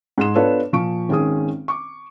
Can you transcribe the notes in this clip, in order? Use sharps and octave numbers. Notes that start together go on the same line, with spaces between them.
G#2 G#4 C6 E7
B3 D4 F4 A4 B4 C#5
A#2 F3 C#6 D7
G#1 D#3 C#4 G#4 D#6
C#6 D6